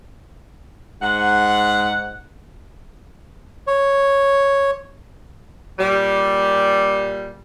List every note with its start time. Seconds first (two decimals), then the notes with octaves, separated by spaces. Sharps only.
1.02 G#2 F#5
3.67 C#5
5.79 A#2 G3